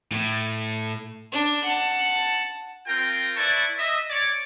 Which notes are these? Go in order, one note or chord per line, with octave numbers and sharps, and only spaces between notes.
A2
D4
F#5 A5
C4 F4 A#4 G5
E4 B4 D5 A5 C#6
D#5 E5
C#5 D5